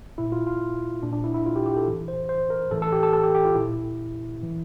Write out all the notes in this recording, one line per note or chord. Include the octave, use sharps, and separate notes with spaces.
A#2 E4
F4
F4
A#2 D4
D4
E4
E4
F4
G4
G4
A4
A2 E3
C5
C5
A#4
A2 E3 A4
A4
G4
A4
A4
G4
G4
F4
A#2 E4
A2 E3